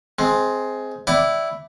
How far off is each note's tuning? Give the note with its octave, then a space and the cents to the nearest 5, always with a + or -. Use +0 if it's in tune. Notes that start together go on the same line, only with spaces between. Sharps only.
G#3 +15 C4 +0
E4 +0 D5 +0 G5 -45